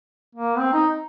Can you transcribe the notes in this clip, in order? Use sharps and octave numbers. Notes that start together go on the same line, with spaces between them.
A#3
C4
D#4